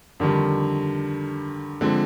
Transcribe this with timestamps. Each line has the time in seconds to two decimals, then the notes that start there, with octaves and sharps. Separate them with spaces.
0.20 F2 D3 D#3 G3
1.81 D3 F3 G#3 C4